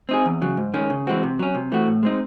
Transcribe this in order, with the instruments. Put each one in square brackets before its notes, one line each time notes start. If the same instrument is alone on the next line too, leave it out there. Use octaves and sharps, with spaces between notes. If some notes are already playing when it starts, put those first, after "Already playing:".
[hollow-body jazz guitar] C4 D#4 G#4
E2
C#3 F#3
G#2
D#3 G#3 C#4
C#3
E3 G#3 C4 F#4
C3
F#3 C#4
C3
E3 A3 C4 F#4
A2
G#3 C4 D#4